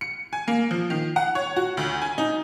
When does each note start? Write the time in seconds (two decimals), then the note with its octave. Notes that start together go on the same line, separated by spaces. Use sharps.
0.01 C#7
0.33 G#5
0.48 A#3
0.71 F3
0.90 D#3
1.16 F#5
1.35 C#5
1.56 F#4
1.77 D2
2.02 G#5
2.18 D#4